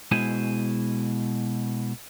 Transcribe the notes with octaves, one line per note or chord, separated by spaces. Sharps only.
B2 G#3 E4 C5 G#5